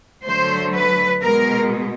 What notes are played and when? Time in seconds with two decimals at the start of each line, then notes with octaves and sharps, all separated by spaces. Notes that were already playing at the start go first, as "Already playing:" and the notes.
0.24 D3 F#3 A3 C5
0.73 B4
1.21 B2 G#3 A#4